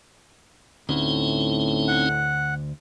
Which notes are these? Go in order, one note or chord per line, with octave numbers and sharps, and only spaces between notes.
D2 A2 C4 C#4 D#4
F#5